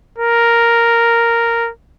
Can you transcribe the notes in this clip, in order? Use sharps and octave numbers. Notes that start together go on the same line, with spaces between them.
A#4